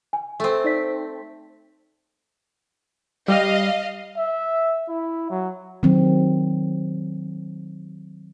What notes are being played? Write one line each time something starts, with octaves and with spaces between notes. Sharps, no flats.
G#5
A3 C4
D#4 D5 B6
G3 G4 D#5 F5 F6
E5
E4
F#3
D#3 F#3 C4